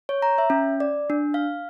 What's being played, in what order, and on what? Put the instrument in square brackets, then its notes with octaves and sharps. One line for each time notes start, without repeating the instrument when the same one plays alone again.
[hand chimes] C#5
A#5
E5
C#4
D5
D4
F5